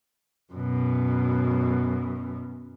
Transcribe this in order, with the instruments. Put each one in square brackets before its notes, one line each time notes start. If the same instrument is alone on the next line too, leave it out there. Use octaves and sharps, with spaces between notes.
[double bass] F#2 B2